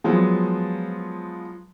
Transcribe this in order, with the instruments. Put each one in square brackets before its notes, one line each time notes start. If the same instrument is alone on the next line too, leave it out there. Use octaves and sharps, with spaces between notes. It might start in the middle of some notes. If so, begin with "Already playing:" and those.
[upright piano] F3 F#3 G#3 B3